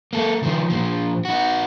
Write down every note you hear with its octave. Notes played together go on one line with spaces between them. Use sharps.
A#3 A4
D#3 F3
A#2 F3
D#4 F#4